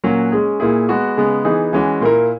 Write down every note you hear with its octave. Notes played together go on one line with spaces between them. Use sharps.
A#2 F#3 A#3 C#4 F#4
G#3 C#4 G#4
A#2 A#3 E4 G#4
G#3 B3 F#4
C#3 G#3 B3
E3 B3 D#4 G#4
E3 G#3 C#4 F#4
A#2 A#3 E4 A#4